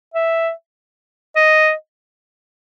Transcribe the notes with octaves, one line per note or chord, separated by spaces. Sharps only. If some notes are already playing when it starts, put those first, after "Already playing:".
E5
D#5